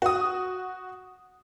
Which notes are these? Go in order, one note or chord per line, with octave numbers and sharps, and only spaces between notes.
F#4 D#6